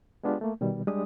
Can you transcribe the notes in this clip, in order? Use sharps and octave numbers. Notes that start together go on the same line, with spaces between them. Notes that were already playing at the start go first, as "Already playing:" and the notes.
G#3 B3 D4 F4 G4
A3 A#3
B2 D#3 G3
G3 G#3 D4 G4 D#6